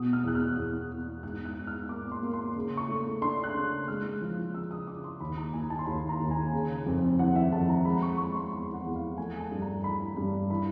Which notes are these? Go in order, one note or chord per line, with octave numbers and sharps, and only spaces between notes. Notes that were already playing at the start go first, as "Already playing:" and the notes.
Already playing: B2 D#6
F6
E2 F#6
F6
E2
E2
G#2 F#6
F#6
G#2
F6
A#3 D6
C6
A#3
C6
C#3
C#6
A3
D4 C6
F#6
C#3
G#3 F6
F3
C#3 E6
D#6
C#3 D6
C6
D#2 B5
A#5
D#2 G#5
A5
C6
D#2 B5
A#5
D#2
G#5
C#3
F2
E3 F#5
E5
F2 A5
A#5
G#3 B5
C#6
G#3 C#6
C6
E2 C6
F#5
E2
F5
A3 G#5
A5
G2
A#5
E3 B5
G2
E3 B5